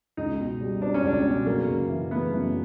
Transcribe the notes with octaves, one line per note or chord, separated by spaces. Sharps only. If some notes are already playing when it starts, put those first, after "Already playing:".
C#2 D#4
B2
G3
C4 D4
C#4
C#2 D4
B2
F#2 A#3
C#3
E3
A3 B3
F#2